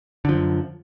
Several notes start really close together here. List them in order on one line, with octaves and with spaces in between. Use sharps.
D3 F3 F#2